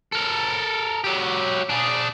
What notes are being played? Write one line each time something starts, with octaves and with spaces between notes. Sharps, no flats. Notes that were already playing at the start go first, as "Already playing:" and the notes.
A4 A#4
F#3 G4
D4 G#4